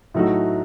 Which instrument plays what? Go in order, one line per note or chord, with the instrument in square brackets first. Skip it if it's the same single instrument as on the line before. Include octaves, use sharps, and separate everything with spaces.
[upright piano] A2 F#3 A3 D#4 F#4